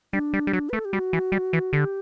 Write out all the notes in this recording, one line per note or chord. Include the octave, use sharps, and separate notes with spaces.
G3 D4
G3
G3
F#3
B4
A3
A4
G4
G3 F#4
E3
G3
E3
D3 G4